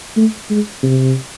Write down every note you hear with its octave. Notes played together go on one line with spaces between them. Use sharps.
A3
G#3
C3